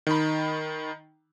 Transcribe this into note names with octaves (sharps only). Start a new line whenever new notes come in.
D#3 D#4 B5